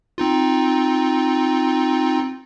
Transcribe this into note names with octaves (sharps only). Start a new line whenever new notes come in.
C4 D#4 F4